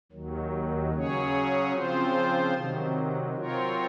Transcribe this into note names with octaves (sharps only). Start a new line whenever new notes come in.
D#2 D#3 F#3
C#3 F#3 C#4 G#4 C#5
C#3 F3 C4 F4 C5
C3 D#3 F#3
F#3 C4 F4 A#4 C#5